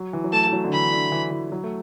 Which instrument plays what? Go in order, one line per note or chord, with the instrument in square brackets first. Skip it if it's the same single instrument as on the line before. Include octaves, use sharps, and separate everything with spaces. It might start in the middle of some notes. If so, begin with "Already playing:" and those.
Already playing: [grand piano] F#3
E3
F#3
[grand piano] A3 [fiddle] A5
[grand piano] A3
F#3
D3
[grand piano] E3 [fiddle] B5
[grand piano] D3
E3
E3
F#3
A3